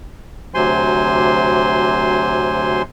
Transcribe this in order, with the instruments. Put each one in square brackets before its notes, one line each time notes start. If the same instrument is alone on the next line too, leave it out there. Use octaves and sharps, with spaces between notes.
[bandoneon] D2 C3 F#3 C5 G#5 C6